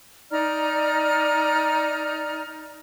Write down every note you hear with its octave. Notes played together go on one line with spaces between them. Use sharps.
D#4 D5 A#5 F6